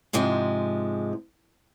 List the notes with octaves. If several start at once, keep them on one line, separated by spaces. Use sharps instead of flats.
G#2 C3 F3 G#3